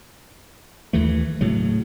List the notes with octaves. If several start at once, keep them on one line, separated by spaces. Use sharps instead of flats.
D#2 E3 A3
A2 C#3 F#3